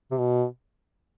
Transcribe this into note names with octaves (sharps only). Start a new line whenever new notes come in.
C3
B2